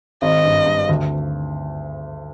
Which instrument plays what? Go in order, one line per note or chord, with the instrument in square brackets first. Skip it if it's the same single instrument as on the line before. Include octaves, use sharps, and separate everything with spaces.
[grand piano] G#1 [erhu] D#5
[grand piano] G2
G2
D2